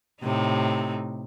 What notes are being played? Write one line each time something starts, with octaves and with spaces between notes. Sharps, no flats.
A2 C3 D#4